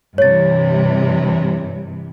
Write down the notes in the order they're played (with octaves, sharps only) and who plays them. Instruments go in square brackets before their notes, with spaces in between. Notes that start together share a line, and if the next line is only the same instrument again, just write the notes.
[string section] G2 C3 E3 [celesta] C#5 A6